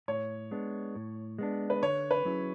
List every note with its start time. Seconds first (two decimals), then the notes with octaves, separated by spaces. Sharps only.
0.08 A2 C#5
0.51 G#3 B3 D4
0.95 A2
1.39 G#3 B3 D4
1.70 B4
1.82 D3 C#5
2.11 B4
2.25 F#3 C#4 E4 G#4